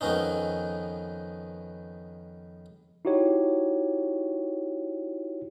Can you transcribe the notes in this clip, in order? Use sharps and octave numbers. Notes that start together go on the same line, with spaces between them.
F2 D#3 B3 C#4 D#4
D#4 E4 F#4 G4 C#5